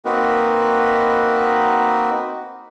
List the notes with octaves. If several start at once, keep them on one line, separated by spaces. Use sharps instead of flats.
A#3 C4 D#4 F#4 A#4 B4